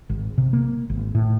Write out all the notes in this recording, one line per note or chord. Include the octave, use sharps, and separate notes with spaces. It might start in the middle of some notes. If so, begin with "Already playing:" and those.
G#1
C3
A#3
G#1
A2